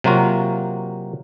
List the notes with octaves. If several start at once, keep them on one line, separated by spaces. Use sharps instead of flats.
C3 F#3 A#3 F4 F#4